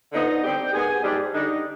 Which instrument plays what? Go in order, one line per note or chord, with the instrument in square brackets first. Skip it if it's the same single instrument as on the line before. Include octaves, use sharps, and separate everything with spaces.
[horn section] D3 F3 B3 D#4 D#5
D3 G3 C4 G4 G5
G#2 D#3 B3 G#4 G#5
G#2 G3 D4
D3 G3 D4 D#4 D#5